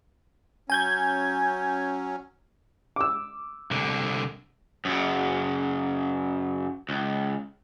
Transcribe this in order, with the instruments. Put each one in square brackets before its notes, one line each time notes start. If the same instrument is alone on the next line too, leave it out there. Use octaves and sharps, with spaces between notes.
[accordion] F#3 C#4 [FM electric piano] G#5 G6 G#6
[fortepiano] D6 E6
[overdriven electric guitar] C2 D3
F#2 C#3
C#2